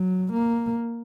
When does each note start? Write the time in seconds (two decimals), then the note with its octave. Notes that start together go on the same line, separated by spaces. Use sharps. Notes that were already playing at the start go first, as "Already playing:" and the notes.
Already playing: F#3
0.33 A#3